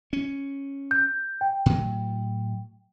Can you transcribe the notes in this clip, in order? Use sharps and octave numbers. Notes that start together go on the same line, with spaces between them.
C#4
G6
G5
A2 F#3